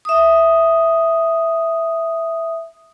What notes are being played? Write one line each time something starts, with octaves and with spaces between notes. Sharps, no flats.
E5 D#6